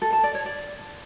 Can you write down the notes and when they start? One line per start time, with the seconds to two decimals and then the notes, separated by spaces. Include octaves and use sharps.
0.02 A4
0.13 A5
0.24 D5
0.35 C#5
0.46 D5